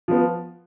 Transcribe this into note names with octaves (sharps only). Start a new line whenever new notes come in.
F3 B3